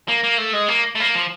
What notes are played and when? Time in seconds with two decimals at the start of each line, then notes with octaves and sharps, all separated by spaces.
0.08 A#3
0.23 A#3
0.38 A3
0.53 G#3
0.68 A#3
0.95 A3
1.00 A#3
1.15 F3